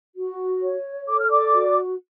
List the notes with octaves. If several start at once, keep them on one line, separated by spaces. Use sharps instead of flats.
F#4
C#5
A4 D6
F6
D5 D6
F#4